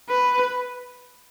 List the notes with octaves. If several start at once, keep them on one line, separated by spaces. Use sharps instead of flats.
B4